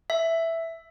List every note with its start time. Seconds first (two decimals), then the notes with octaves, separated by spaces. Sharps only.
0.10 E5